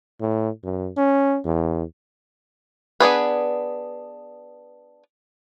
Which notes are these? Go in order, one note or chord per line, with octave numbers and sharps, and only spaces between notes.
A2
F#2
C#4
E2
B3 D4 G#4 B4